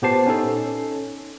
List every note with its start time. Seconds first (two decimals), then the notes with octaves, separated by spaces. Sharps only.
0.02 A#2 B3 G4 C5 A5 C7
0.27 C#4 D#4 A4